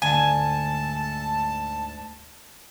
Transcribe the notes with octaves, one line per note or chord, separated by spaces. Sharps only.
D2 G#2 G#5 A5